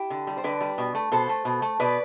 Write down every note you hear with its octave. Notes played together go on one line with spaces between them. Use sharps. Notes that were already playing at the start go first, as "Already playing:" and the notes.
Already playing: E4 G4
D3
G3
C5
D3 B4 D5
G3
B2
A3
B2 A4 C5
A3
B2
A3
B2 B4 D5